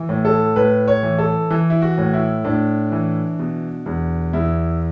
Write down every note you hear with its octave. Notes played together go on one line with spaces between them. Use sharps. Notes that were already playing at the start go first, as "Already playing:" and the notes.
Already playing: E3
A2
A4
A2 B4
C#5
E3
A4
E3
E4
F#4
A2
E4
A2 D4
E3
B2
E2
E2 E4